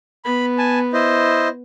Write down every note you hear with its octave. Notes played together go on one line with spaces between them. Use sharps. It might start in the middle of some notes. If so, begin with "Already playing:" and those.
B3 B5
G#5 A5
E4 C5 D#5